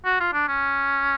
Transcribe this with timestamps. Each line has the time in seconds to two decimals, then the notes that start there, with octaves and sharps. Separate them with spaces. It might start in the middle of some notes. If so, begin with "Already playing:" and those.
0.05 F#4
0.20 F4
0.33 D4
0.48 C#4